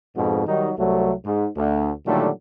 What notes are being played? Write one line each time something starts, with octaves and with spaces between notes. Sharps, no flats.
F2 G#2 B2
D#3 F#3 G3 D#4
C2 F#3 A3
G#2
D2
A#2 D3 D#3 F#3 G3 A3